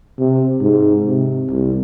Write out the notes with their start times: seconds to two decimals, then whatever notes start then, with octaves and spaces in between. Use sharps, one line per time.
0.19 C3
0.61 G#2
1.06 C3
1.51 C2